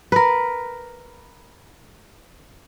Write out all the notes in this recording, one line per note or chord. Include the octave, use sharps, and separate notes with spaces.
A#4 B4